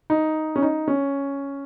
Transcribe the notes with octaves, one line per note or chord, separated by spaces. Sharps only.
D#4
C#4
D#4
C#4